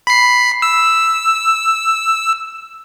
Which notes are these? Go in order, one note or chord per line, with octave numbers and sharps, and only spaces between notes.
B5 C7
E6